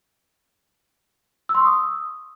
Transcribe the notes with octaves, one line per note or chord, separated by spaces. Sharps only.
E6
C6
C#6
D#6